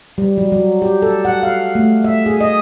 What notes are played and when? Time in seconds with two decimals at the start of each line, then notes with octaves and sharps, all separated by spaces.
0.18 G3
0.38 F#3
0.52 F#3
0.82 G4
1.02 A4
1.25 F#5
1.43 F5
1.75 A3
2.04 E5
2.26 G#4
2.41 D#5